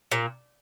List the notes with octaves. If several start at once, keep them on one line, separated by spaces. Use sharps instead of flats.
A#2